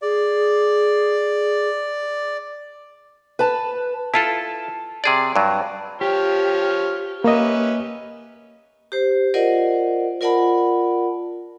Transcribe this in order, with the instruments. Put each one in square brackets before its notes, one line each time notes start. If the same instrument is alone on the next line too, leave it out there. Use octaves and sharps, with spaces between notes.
[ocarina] G#4 [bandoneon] D5
[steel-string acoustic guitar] B4 A5
[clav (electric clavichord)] E4 F4 A4 [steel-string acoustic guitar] A5
[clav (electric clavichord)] C3 G#4 D5
G2 F#3
[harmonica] F3 C#5 F6 [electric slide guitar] G4
[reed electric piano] A#3 D#5 [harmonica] C#4 B4 E5
[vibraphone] G4 C5
F4 A#4 C5 D5 D#5 F#5
F4 A#4 D5 F#5 A5 B5